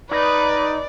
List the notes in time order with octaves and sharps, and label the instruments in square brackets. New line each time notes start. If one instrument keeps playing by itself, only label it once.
[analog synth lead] D#4 [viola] B4 [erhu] D5